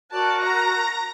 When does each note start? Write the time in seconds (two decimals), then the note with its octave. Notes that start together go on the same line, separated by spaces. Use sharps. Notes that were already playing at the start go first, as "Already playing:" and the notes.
0.11 F#4 A#4 D5 A5 F#6
0.41 A#5 A#6